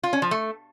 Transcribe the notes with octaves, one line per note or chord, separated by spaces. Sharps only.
F4
C#4
F3
A3